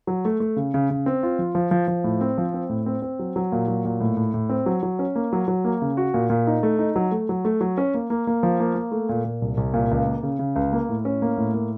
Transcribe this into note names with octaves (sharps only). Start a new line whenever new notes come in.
F#3
A3
A3
C#3
C#3
C#3
C4
F4
F3
F3
F3
F3
A2
C4
F3
C4
A2
C4
C4
F#3
F#3
A#2
F#3
A#2
A2
A2
A2
C4
F#3
F#3
C#4
A#3
F#3
F#3
A#3
C#3
F#4
A#2
A#2
D#4
A3
D#4
F#3
A3
F#3
A3
F#3
C#4
A#3
A#3
A#3
F3
A#3
A#3
A3
A#2
A#2
C2
C2
A#2
C#2
A#3
C#3
C#3
C#2
A#3
A2
C#4
A#3
A2
A#3